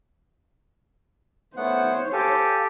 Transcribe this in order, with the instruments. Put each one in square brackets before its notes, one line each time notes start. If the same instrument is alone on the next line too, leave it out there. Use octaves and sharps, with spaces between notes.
[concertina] A3 B3 F#5 [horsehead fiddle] C5 C#5
[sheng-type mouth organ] G4 A4 [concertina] F5 G5 G#5